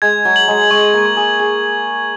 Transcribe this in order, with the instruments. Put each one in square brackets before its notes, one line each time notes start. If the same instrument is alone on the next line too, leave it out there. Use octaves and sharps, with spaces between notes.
[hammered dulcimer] G#3 [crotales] G#6
[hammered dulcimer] F#3
[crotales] F#7
[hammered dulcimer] G#3
[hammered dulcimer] G#3 [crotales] C#6
[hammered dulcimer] A#3
[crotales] C#6
[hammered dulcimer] G#4
[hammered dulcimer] G#4 [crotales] F#7